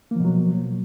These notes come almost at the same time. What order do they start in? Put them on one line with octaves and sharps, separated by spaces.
A#3 F3 B2 F#3